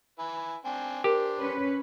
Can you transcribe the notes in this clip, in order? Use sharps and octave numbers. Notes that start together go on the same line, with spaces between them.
E4 B4 G#5
C4 D4 G#5
D4 G4 A#4 C5
C#4 B4